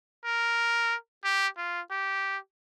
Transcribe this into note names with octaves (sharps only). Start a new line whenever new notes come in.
A#4
G4
F4
G4